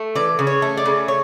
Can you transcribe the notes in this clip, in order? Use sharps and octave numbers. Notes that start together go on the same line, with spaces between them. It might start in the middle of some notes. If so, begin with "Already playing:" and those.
Already playing: A3
E3 D5
C#3
C#5
A3
D5
C#3
C#5